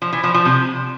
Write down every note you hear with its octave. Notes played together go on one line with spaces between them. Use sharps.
F3
E3
F3
F3
C3